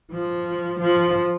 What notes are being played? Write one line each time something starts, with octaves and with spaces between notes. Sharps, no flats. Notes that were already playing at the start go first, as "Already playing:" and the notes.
F3
F3